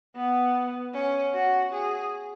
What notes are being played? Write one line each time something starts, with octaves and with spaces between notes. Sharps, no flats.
B3
C#4
F#4
G#4